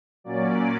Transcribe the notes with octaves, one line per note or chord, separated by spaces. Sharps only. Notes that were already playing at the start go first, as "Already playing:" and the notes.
A#2 F#3 A#3 C#4 D5